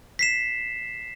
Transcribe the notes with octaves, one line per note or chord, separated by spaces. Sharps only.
B6 C7 E7